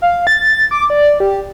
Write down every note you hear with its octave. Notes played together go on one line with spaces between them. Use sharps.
F5
A6
D6
D5
G4